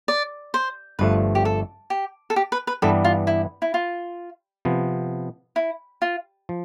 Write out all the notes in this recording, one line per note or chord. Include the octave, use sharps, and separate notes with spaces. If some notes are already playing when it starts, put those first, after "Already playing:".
D5
C5
G1 G2 F3 A3 B4
G4
A4
G4
A4
G4
B4
B4
G2 E3 G3 B3 D4 A4
F4
E4
E4
F4
C3 F3 B3
E4
F4
F3